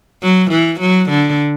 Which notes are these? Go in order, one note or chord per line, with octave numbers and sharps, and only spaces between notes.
F#3
E3
F#3
D3